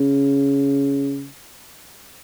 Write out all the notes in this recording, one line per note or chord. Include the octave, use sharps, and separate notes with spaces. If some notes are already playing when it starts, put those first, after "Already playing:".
Already playing: C#3